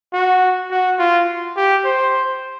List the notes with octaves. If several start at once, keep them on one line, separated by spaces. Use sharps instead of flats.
F#4
F#4
F4
G4
C5